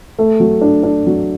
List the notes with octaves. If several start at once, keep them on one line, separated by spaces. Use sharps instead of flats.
A3
F#3
D4
D4
F#3